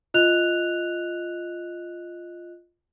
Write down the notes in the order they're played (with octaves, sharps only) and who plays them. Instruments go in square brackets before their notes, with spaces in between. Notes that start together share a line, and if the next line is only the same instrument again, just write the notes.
[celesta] F4 D#5 F#6 F7